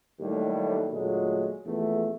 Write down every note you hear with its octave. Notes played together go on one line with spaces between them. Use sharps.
D#2 A2 F#3 G3 A3
D2 A#2 F#3 G#3 A3
A#1 E2 A3